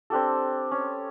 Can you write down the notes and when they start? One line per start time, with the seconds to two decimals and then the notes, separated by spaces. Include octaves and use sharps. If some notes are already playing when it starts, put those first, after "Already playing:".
0.10 C4 D4 G4 A4
0.71 C#4